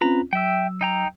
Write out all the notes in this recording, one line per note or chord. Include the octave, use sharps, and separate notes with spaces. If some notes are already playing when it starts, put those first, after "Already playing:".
C4 C#4 F4 B4 A#5
F#3 E5 G5 E6
D#4 G5 A#5